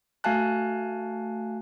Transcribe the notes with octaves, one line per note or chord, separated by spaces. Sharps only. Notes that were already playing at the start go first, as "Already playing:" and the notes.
A3 F#4 F5 G#5 A5 F#6